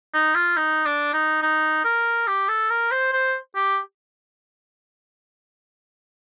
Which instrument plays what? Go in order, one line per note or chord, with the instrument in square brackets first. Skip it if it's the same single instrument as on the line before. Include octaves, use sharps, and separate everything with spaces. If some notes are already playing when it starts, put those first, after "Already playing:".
[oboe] D#4
F4
D#4
D4
D#4
D#4
A#4
G4
A4
A#4
C5
C5
G4